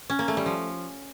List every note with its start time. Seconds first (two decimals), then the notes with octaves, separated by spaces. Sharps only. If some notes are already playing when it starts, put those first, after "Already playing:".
0.10 C#4
0.19 A#3
0.28 A3
0.37 G3
0.46 F3